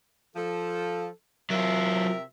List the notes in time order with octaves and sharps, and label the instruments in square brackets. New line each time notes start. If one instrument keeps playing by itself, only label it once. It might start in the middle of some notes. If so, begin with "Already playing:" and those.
[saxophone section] F3 A4
[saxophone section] C3 A#4 E5 [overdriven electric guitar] F#3 F4